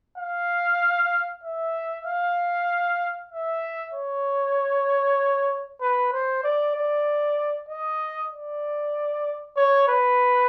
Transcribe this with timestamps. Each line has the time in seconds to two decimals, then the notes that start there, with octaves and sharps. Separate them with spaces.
0.18 F5
1.44 E5
2.06 F5
3.31 E5
3.94 C#5
5.81 B4
6.12 C5
6.44 D5
6.76 D5
7.69 D#5
8.32 D5
9.56 C#5
9.88 B4